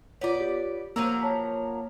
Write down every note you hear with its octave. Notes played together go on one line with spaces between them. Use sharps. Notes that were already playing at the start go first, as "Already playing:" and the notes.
B3 F4 C#5 D5
G4
F3 F#3 A#3 A#4 E6
C#5 A5 B6